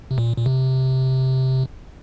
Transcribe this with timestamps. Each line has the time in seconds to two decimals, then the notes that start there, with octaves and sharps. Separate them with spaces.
0.11 C3
0.18 A#2
0.37 A#2
0.46 C3